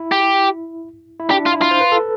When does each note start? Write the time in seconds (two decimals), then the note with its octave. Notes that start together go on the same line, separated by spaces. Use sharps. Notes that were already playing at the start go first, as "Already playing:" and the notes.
Already playing: E4
0.12 G4
1.20 E4
1.30 D4 G4
1.46 F4
1.54 E4
1.62 F4
1.71 C5
1.81 B4
1.92 A4